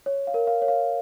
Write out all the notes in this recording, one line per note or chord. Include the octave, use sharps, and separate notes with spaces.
C#5
F5
A#4
F5
C#5
F5